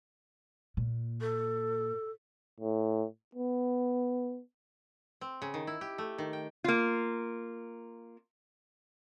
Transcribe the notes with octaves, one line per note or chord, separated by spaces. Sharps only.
A#2
A4
A2
B3
C4
C#3
D#3
E4
G4
A3
D#3
G5
A#3 F4